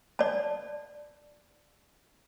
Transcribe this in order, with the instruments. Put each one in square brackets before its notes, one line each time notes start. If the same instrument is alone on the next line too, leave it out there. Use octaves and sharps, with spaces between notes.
[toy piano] D5 A5